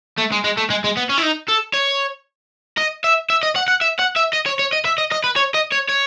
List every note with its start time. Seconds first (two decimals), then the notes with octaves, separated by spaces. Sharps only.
0.18 A3
0.32 G#3
0.44 G#3
0.57 A3
0.70 G#3
0.84 G#3
0.97 B3
1.09 C#4
1.17 E4
1.22 D#4
1.49 A4
1.74 C#5
2.77 D#5
3.04 E5
3.30 E5
3.43 D#5
3.56 F#5
3.68 F#5
3.82 E5
3.99 F#5
4.17 E5
4.33 D#5
4.46 C#5
4.59 C#5
4.73 D#5
4.85 E5
4.98 D#5
5.12 D#5
5.24 B4
5.36 C#5
5.54 D#5
5.72 C#5
5.89 C#5